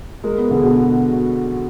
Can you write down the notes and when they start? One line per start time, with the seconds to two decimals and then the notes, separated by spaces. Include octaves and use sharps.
0.24 G#3 A#4
0.38 B3
0.51 D3 G#4
0.63 B2
0.77 F#4